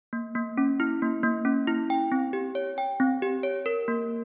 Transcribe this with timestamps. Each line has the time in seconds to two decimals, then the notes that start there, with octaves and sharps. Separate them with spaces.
0.13 A#3
0.35 A#3
0.58 C#4
0.80 E4
1.02 A#3
1.23 A#3
1.45 C#4
1.67 E4
1.90 G5
2.12 C4
2.33 G4
2.55 C#5
2.78 G5
3.00 C4
3.22 G4
3.43 C#5
3.66 A#4
3.88 A#3